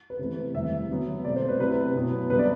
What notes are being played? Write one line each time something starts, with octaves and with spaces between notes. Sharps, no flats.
B4
C3 E3 A3
E2 C3 E3 G3 E5
D3 F#3 B3
B2 A3 C4 D5
C5
B4
C3 F#3 C4 E4 B4
B2 F#3 B3 E4
C3 G3 B3 D4 B4
D5